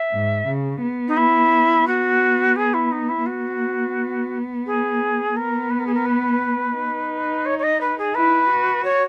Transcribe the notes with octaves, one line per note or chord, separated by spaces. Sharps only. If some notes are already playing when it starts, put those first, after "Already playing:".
Already playing: E5
G#2
C#3
B3
D#4
E4
B3 F#4
G#4
E4
D#4
E4
B3 F#4
G#4
B3 A#4
B4
A#4
G#4
A#4
B4
D#4
C#5
C#5
D#5
B4
G#4
E4 B4
F#4
C#5